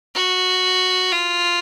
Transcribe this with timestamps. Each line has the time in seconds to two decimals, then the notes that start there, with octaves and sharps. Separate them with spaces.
0.15 F#4
1.12 F4